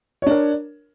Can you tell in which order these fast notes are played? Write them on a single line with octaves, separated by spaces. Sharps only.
C#5 D4 A#4